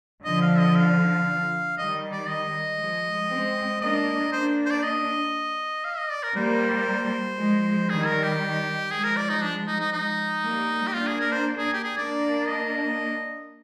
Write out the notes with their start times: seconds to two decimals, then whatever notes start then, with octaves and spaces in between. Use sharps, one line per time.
0.25 D3 F3 D#5
0.42 F5
0.59 D#5
0.76 F5
1.77 D#3 G3 D#5
2.12 D5
2.29 D#5
2.80 F3 G#3
3.30 G#3 C4
3.81 A#3 D4 D#5
4.32 A#3 D4 C5
4.66 C5
4.71 D5
4.83 D#5
5.85 F5
5.98 D#5
6.11 D5
6.23 A#4
6.36 G3 A#3 C5
7.38 F3 G#3
7.89 D#3 G3 G#4
8.06 A#4
8.23 G4
8.91 F3 G#3 G#4
9.04 A#4
9.17 D5
9.29 D#4
9.42 D4
9.67 D#4
9.80 D#4
9.93 D#4
10.44 G3 A#3
10.87 G4
10.95 A#3 D4 F4
11.07 G#4
11.20 A#4
11.33 C5
11.58 G#4
11.73 G4
11.84 G#4
11.96 A#3 D4 D5
12.47 D#5